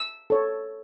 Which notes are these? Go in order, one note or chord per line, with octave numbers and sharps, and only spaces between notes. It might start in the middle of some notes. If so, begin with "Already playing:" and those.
Already playing: E6
A4 C#5